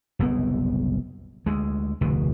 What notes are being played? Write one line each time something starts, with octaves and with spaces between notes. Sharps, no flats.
F#1 C2 A#2 B3
D2 G#3
F1 D2 B2